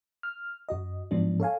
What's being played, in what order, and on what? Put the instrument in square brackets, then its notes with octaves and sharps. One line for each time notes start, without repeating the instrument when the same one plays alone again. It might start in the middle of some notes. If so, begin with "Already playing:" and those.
[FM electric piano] F6
F#2 F#4 D#5
G#2 F3 F#3 B3 D4
A4 C#5 F5 G#5